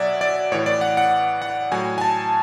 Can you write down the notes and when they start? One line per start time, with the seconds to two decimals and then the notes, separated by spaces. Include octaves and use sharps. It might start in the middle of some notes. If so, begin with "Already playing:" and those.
Already playing: B2 F#3 D5 E5 F#5 G#5
0.21 D5
0.52 A2 E3 C#5
0.66 D5
0.81 F#5
0.97 F#5
1.42 F#5
1.72 A2 F#3 G#5
1.98 G#5
2.01 A5